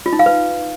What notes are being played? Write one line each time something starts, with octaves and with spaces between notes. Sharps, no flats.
F4
D#4
F5
B4